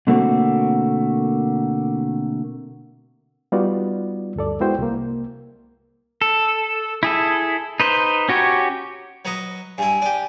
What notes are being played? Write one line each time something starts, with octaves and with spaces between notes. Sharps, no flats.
B2 D3 A3 A#3 C4 F#4
G3 B3 D#4 F4 F#4 D5
D2 G2 A4 D5
G#3 B3 E4 F#4 C5 G5
C2 A#3
A4
E4 G#4 A4
D#4 B4 C5
C#4 F#4 G4 C#5
F#3 B4 D#5
G2 E4 G#5
D4 G4